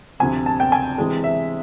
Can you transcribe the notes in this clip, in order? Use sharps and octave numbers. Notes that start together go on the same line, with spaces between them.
D2 C3 F3 G#5
A5
G5
G#5
C3 E3 G#3
E5